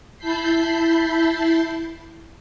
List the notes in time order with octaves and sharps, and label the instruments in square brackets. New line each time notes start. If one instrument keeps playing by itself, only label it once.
[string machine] E4 A5 B5 G6 B6 C7